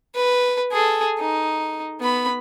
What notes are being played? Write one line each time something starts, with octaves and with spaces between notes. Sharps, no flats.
B4
G#4 A4
D#4
B3 B5